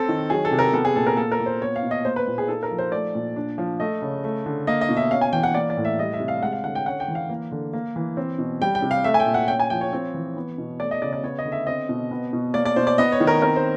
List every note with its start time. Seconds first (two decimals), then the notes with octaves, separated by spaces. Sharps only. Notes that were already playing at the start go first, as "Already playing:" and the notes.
Already playing: C4 A4
0.09 D#3
0.30 F#3 G#4
0.45 A4
0.51 C3
0.59 A#4
0.73 B3 A4
0.85 G#4
0.95 A#2 A4
1.07 A#4
1.17 A#3 A4
1.32 A#4
1.40 A#2
1.46 C5
1.62 B3 C#5
1.76 F5
1.83 B2
1.91 D#5
2.05 A#3 C5
2.16 B4
2.27 A#2
2.38 G#4
2.48 D#4 A4
2.63 A#4
2.71 F3
2.78 C5
2.92 A3 D5
3.15 A#2
3.36 D4
3.58 F3
3.80 A3 D#5
4.02 C#3
4.24 A3
4.46 D3
4.67 A#3 D#5
4.81 D#5
4.89 B2
4.97 E5
5.11 C#4 F5
5.21 G#5
5.33 E3 G5
5.43 F#5
5.55 A#3 D5
5.70 D5
5.77 A2
5.85 E5
5.99 G3 D#5
6.13 E5
6.20 C3
6.28 F5
6.43 G#3 F#5
6.53 F5
6.64 D3 F#5
6.75 G5
6.86 C#4 F#5
7.00 G5
7.08 E3
7.15 F5
7.30 A#3
7.52 D3
7.73 A#3
7.96 E3
8.17 C4
8.39 B2
8.61 G3 G5
8.75 G5
8.82 C3
8.91 F5
9.04 A3 E5
9.14 G#5
9.20 G5
9.26 A#2
9.34 F#5
9.48 C#4 G5
9.60 G#5
9.70 F3 G5
9.81 C#5
9.93 C4
10.14 E3
10.37 B3
10.58 B2
10.80 A3 D5
10.91 D#5
11.02 C#3 D5
11.13 D5
11.23 B3 C#5
11.39 D#5
11.45 D3
11.52 E5
11.67 C4 D#5
11.89 B2
12.11 B3
12.33 B2
12.54 A#3 D5
12.65 D5
12.76 B2 C5
12.87 D5
12.98 B3 D#5
13.12 C#5
13.20 D#3
13.27 A#4
13.42 C4 A#4
13.56 C5